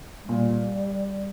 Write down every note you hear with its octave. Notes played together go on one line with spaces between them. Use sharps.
G#3
A#2 G3